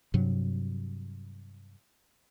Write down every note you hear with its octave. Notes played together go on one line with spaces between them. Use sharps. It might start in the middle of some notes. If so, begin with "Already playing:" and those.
G2 C3 F#3